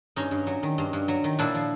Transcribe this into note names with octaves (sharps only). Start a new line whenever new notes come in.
G2 C#4 D#4
G2
F#3
D#3
G2
G2
F#3
D#3
A#2 D4 E4
F3